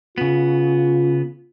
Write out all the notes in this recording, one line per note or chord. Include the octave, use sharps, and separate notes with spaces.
C#3 B3 F4